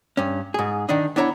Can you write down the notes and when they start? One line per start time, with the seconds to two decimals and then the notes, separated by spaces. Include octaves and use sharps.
0.17 G2 C#4
0.54 G#2 G#4
0.89 D#3 D4 D#4
1.16 B3 D4 E4 C#5 A#5